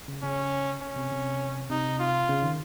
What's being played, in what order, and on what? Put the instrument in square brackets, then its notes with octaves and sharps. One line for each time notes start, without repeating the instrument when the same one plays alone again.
[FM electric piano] C#3
[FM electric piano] C#3 [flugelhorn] C#4
[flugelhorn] C#4
[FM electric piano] C3
C3
[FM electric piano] C3 [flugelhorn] D#4
[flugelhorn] F4
[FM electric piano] C#3
D#3